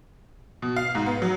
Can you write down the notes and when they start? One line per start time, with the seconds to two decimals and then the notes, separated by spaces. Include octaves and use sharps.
0.62 B2
0.76 F5
0.95 G#2
1.06 B3
1.22 F#3